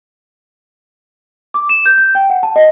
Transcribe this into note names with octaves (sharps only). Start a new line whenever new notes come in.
D6
E7
G6
G6
G5
F#5
A5
D#5